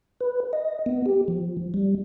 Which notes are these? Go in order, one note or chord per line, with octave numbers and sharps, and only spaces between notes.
B4
D#5
B3
G4
F3
G3